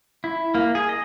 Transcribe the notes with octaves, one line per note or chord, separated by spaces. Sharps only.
E4
A#3
G#4
D#5